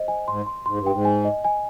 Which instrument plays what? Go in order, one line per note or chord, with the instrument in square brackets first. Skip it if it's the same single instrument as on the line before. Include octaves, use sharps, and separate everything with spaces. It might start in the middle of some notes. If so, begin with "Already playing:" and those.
Already playing: [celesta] C5 D#5
G#5
[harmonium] G#2 [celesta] C6
[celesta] C6
[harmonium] G#2 [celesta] C6
[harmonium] G2
[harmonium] G#2 [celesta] G5
[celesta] G#5
D#5
G#5